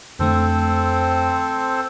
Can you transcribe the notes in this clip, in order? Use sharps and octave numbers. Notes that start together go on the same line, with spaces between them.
F2 D3 A3 C4 A4 C5